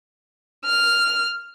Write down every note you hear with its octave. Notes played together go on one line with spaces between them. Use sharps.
F6